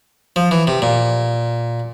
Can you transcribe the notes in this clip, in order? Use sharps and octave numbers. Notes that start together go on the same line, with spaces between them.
F3
E3
C3
A#2